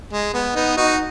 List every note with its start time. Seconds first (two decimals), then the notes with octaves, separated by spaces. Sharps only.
0.13 G#3
0.34 B3
0.56 B3 D#4
0.77 D#4 F#4